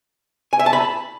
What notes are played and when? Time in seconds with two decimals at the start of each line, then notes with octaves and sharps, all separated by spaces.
0.53 G#5
0.59 E5
0.66 A5
0.73 B5